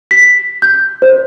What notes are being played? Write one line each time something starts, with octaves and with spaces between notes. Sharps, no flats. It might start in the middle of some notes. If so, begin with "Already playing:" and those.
B6
G6
C5